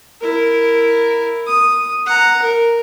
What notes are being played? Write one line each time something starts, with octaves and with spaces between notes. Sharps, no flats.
E4 A#4
D#6
F#5 A#5
A#4